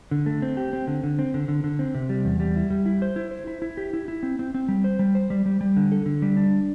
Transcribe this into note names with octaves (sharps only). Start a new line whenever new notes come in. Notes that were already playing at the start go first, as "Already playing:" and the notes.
D3
A3
C4
G4
C4
D3
D3
C4
D3
D3
D3
C4
C3
G3
E2
G3
E4
G3
E4
C5
E4
C5
E4
E4
G4
E4
E4
C4
C4
C4
G3
C5
G3
C5
G3
G3
G3
D3
A4
D3
G3
D4